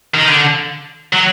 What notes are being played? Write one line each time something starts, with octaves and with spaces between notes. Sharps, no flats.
D#3
D3
F#3